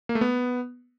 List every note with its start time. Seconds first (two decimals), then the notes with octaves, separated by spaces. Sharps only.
0.09 A#3
0.15 A3
0.21 B3